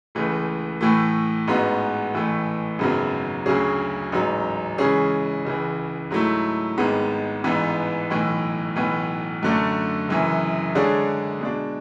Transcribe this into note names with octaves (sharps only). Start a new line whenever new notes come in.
C#2 C#3 E3 A3
A2 E3 A3
A1 G#2 G#3 B3 F#4
A1 A2 E3 A3
G#1 F#2 C#3 F#3 B3
D2 C#3 F#3 C#4 G#4
A1 G#2 F#3
C#3 E3 G#3 C#4 G#4
C#2 C#3 E3
G#2 F#3 A3 E4
G#1 G#2 G#3 B3
A1 G#2 E3 B3
B1 A2 E3
B1 A2 E3 B3
F#2 D3 A3 D4
F#1 F#2 E3
D3 G#3 D4 G#4 C#5
B2 G#3 D4